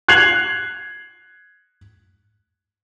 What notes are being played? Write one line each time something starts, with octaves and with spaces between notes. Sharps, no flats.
F#6 G#6 C7 F7 F#7